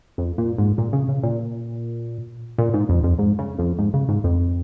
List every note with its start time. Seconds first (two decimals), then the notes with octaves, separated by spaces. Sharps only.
0.18 F2
0.38 A#2
0.58 G#2
0.78 A#2
0.93 C#3
1.08 C#3
1.23 A#2
2.58 A#2
2.74 G#2
2.89 F2
3.03 F2
3.19 G#2
3.39 C#3
3.59 F2
3.79 G#2
3.94 C#3
4.08 G#2
4.24 F2